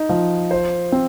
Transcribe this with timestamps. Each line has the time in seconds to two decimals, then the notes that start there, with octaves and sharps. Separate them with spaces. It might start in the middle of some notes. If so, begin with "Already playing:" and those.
Already playing: D#4
0.09 F3
0.51 C5
0.92 C4